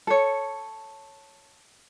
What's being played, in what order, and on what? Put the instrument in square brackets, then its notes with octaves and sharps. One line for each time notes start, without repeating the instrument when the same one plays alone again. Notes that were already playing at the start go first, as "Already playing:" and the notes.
[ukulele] A4 C#5